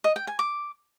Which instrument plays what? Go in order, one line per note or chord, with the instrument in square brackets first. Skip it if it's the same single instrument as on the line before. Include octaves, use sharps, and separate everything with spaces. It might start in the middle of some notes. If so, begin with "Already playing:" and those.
[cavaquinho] D#5
G5
G#5
D6